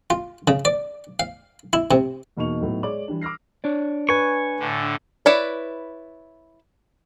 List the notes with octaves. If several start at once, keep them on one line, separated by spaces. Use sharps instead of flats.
F4
C#3
D5
F5
E4
C3
E2 B2 A#3 D#4 C#6 F7
A2 F#3 B3 D#4
G#3 C#5 D5 D6 F#7
E3 G3 D4
D6 E6 F6 A#6 C7
D4 C#5 D5
B4 G#5 C#6
A2 D3
E4 B4 C#5 D5